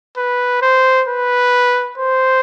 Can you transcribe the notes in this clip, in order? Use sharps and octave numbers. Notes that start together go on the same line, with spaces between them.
B4
C5
B4
C5